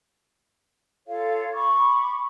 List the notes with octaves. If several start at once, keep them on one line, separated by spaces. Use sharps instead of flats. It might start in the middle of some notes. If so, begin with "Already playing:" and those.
F4 A4 C#5 F5
B5 C#6 D6